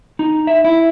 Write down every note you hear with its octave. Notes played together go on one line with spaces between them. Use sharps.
D#4
E5
E4